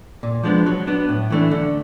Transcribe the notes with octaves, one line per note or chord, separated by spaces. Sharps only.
A#2
F3 G#3 B3 D4
F#3
B3 D4
A2
E3 A3 D4
D3